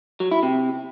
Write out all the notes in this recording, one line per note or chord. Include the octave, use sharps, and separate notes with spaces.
F#3
E4
C3